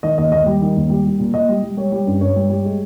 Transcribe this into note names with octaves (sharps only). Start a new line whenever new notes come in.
D#3 D#5
D#2 D#5
D#2 D#5
G3
D#3
D#2
G3
G3
A#2
A#2 D#5
G3
G3
G3 C#5
G3
G2
G2 C#5
G3
G3
G#3